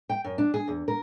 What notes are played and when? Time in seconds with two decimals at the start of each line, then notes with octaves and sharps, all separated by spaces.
0.09 G5
0.24 F#2
0.38 D4
0.54 G#4
0.68 E2
0.88 A#4